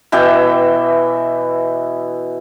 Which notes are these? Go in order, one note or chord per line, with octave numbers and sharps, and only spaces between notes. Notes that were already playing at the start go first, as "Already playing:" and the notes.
B2 E3 E5 G5